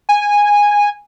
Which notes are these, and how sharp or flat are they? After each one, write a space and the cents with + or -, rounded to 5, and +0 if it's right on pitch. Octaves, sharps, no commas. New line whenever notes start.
G#5 -10